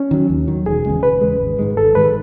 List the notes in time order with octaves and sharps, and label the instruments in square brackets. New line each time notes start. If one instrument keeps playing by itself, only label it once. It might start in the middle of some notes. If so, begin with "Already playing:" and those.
Already playing: [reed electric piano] C#4
[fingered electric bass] D#3 F#3
D#2
D#3 F#3
[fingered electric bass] E1 [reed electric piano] G#4
[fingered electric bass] E2 C#3 G#3
[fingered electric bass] E1 [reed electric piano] B4
[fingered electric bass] E2 C#3 G#3
G#1
G#2 D#3 G#3
[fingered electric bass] G#1 [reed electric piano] A4
[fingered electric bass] G#2 D#3 G#3 [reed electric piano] B4